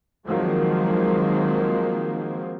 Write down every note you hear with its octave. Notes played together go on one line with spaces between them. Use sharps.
D#3 F3 F#3 G#3 A#3 C4